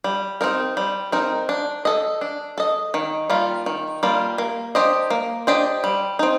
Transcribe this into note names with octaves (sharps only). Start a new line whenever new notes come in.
G3
C4 D#4 A#4
G3
C4 D#4 A#4
D4
A4 D#5
D4
A4 D#5
D#3
G3 A#3 F4
D#3
G3 A#3 F4
A#3
D4 G4 C5 D#5
A#3
D4 G4 C5 D#5
G3
C4 D#4